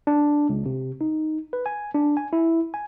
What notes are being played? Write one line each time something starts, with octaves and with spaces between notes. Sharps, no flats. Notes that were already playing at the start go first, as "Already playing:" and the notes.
D4
C#2
C3
D#4
B4
G#5
D4
G#5
E4
G#5